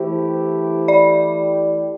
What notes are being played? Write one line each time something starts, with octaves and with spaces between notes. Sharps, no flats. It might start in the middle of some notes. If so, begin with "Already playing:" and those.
Already playing: E3 A3 E4 G4 C5
D5